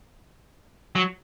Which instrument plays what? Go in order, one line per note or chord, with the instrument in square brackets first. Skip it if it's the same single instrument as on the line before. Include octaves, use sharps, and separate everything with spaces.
[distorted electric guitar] F#3